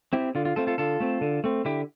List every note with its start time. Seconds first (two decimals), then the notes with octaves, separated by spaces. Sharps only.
0.13 C4 E4 G4
0.35 D3 F4
0.45 F4
0.56 A3 C4 F4 A4
0.67 F4 A4
0.78 D3 F4 A4
1.00 A3 C4
1.21 D3
1.44 A3 C4
1.65 D3 E4 G4